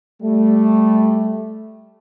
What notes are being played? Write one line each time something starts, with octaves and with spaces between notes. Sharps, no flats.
G3 A3